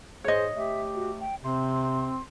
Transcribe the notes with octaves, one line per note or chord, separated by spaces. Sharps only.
G#2 G#4 C5 C#5 D#5
A3 G4 E5
F#4
G5
C3 C4 C6